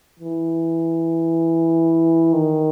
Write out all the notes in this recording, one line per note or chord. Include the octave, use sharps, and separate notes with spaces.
E3
D#3